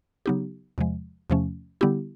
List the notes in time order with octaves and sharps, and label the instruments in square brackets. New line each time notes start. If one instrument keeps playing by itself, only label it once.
[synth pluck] C#3 F#3 B3 D#4 G4
E2 C3 F3 G#3
E2 C3 F3 A3 C#4
D3 G3 B3 E4 G4